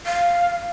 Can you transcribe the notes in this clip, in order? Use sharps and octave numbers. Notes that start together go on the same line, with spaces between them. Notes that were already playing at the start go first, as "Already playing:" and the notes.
F5